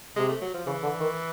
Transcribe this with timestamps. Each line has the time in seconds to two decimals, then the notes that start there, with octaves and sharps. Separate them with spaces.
0.16 C3 G#3
0.29 A3
0.41 F#3
0.54 F3
0.66 C#3 E3
0.83 D3
1.00 D#3